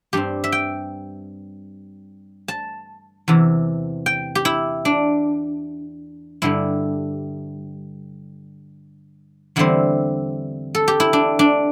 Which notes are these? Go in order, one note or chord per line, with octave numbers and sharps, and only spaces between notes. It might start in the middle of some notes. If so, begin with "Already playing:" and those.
G2 G3 C4 G4
E5
G5
A5
E2 C3 E3
G5
G4
E4
D4
G2 D3 G3 E4
E2 D3 G3 C4 E4
A4
G4
E4
D4
D4